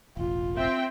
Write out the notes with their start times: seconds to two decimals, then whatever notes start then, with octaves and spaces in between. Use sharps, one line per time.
0.17 E1 A1 F4
0.57 C4 E5 G5